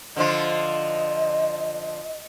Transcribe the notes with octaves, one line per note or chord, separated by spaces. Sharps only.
D3 F3 F4 D#5